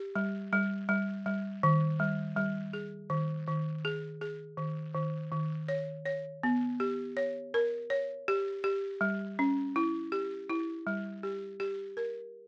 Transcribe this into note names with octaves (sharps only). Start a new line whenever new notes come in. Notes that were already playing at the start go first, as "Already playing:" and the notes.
Already playing: G4
G3
G3
G3
G3
D#3
G3
G3
G#4
D#3
D#3
G#4
G#4
D#3
D#3
D#3
C#5
C#5
B3
G4
C#5
A#4
C#5
G4
G4
G3
C#4
E4
G4
E4
G3
G4
G4
A#4